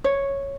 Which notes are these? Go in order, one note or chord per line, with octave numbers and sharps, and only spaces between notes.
C#5